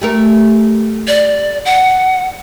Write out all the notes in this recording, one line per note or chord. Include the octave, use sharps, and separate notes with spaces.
G3 A3 A#4
D5
F#5